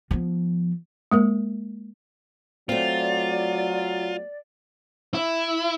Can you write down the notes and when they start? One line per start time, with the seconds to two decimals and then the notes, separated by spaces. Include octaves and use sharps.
0.11 F3 B3
1.11 G#3 A#3 A#4
2.69 F#3 A3 C4 F4 D5
5.14 E4